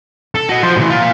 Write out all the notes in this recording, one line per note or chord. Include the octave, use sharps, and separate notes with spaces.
A4
F#4 D#5
F3 C5
A2 E3
F4 A#4